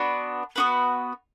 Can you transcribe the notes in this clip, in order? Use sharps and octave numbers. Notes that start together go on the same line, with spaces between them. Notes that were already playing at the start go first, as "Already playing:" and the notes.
Already playing: B3 D4 F#4 B4
B3 D4 F#4 B4